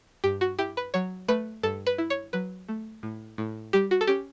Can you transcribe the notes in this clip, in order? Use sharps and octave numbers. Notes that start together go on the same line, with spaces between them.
G2 G4
F#4
E4 G4
B4
F#3 C#5
A3 B4
G2 A4
B4
E4
C#5
F#3 B4
A3
A2
A2
G3 G4
F#4
A4
C#4 G4